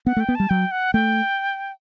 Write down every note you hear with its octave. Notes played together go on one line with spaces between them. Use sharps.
B3 F#5
A3
G5
B3
G3 A5
F#3 G5
F#5
A3 G5